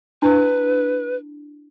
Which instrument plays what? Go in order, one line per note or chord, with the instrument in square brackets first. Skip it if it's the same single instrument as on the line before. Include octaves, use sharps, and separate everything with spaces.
[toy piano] D4 E4 [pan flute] B4